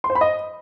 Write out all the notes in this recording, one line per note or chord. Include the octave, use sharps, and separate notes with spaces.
C6
C5
B5
D#5